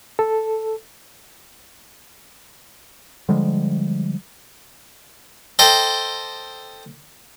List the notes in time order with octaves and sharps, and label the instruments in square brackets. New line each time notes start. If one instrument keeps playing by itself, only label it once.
[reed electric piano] A4
[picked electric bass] D3 F3 G3 G#3
[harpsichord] A4 C5 D#5 G5